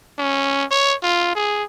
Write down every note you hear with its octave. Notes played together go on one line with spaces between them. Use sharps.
C#4
C#5
F4
G#4